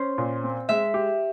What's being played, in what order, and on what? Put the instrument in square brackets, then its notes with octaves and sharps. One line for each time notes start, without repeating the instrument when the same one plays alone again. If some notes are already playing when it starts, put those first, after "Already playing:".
Already playing: [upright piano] C#4 [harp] C5
[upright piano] A#2
C4
[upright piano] G#3 [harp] E5
[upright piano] G4